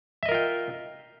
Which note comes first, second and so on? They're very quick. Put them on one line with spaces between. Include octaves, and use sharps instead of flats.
E5 D#5 A#4 F4 G5